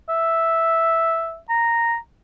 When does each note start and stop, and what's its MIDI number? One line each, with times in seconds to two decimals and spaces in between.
0.09 1.38 76
1.50 1.96 82